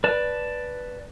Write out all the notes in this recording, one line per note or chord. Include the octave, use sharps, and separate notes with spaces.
B4 D5 A5